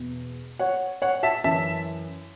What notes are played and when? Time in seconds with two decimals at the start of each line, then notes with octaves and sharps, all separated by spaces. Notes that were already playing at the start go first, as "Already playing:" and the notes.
Already playing: E2 B2
0.59 C#5 F#5
1.02 C#5 F#5
1.23 E5 A5
1.44 F#2 E3 E5 A5